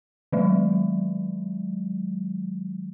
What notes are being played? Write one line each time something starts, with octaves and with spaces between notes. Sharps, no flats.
D#3 F#3 G#3